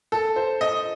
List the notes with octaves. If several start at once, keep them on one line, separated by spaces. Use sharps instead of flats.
A4
C5
D#5